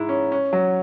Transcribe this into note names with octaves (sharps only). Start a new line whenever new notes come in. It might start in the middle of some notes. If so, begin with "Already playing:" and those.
Already playing: G#2 G#3 E4
C#4
C#4
F#3